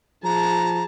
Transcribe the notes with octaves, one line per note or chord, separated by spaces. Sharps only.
F3 G#4 A5 A#5